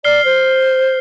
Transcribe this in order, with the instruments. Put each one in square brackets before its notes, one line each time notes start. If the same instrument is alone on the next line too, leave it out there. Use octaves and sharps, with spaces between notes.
[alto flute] D5 [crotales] F6 C7 G7
[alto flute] C5